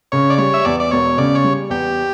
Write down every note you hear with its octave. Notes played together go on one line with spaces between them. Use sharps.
C#3 C#5
D5
G3 C#5
E5
E2 D5
D5
E1 C#5
C#3 D5
C#5
G3
E2 G4